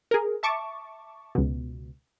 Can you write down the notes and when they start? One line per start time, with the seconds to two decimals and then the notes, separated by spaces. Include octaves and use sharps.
0.11 G#4 A#4
0.43 E5 A5 C#6 D6
1.35 C#2 B2